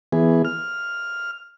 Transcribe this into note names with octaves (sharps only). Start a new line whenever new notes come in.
E3 B3 G#4
F6